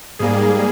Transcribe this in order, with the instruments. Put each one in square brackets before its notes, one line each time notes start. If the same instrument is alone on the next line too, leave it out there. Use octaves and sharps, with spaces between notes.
[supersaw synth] G#2 G3 A#3 G#4